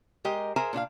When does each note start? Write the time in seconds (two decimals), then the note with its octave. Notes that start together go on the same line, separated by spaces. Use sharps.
0.25 G#3 G4 A#4 D#5
0.56 G#4 A#4 C5 E5 G#5 A#5
0.73 A#2 D4 E4 F5